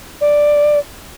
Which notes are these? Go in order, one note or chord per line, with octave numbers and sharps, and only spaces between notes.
D5